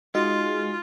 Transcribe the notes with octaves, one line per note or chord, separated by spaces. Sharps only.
G#3 D#4 F4 F#4 D#5